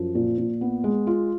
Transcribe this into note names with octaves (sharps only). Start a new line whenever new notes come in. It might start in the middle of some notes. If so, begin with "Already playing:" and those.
Already playing: F#2 F3
A#2
A#2
B3
G#3
F4